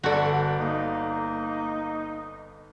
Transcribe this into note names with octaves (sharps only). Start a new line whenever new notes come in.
G1 D3 F#4 A4 D5
A#3 D#4